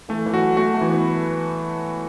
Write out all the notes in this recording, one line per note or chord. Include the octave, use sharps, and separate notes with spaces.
E3 A3
E3
F#3 F#4
A3 F#4
A3
E3
B3